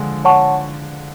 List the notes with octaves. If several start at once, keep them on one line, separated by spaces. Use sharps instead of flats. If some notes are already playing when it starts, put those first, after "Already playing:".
Already playing: D3 F3 G#3
C#5 F#5 A5 C#6